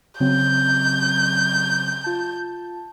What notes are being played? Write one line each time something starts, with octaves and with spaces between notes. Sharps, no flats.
C#3 F#3 C4 G6
F4 A5